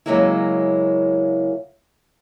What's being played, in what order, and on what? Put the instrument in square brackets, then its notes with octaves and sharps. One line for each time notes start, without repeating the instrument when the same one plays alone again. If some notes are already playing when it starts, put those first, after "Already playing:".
[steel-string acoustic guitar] C#3 F3 F#3 G#3 A#3 E4